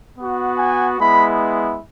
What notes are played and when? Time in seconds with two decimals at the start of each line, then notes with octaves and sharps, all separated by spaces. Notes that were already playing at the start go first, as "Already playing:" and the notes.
0.19 B3 F#4
0.59 G#5
0.99 G#3 B3 E4 B5